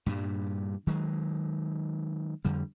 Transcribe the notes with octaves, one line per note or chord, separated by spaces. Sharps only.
G2 A#2 G3
D#3 F#3 G#3
F2 D3 G3